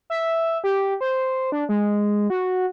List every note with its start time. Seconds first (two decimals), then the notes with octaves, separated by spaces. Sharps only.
0.10 E5
0.64 G4
1.01 C5
1.52 D4
1.69 G#3
2.30 F#4